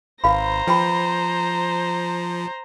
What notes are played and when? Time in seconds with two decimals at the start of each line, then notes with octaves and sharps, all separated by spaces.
0.24 G#1 B4 C5 F5 A#5 B5
0.67 F3 B4 G5 B5